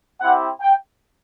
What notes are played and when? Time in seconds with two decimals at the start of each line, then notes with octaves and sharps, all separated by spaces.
0.21 C4 E4 G4 F#5
0.61 G5